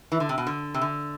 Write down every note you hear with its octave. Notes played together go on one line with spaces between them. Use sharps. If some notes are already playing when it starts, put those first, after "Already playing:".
E3
D3
C3
B2
D3
C3
D3